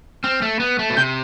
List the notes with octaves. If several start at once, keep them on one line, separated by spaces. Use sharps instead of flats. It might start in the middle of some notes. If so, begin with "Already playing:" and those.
C4 F6
A3
B3
A3
B2
C3 G6